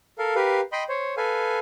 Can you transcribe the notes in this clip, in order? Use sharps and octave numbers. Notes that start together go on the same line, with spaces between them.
A4 A#4 F5
G4 A#4 B4 F5
D#5 G5 B5 C6
C5 C#5
A4 B4 F5 G#5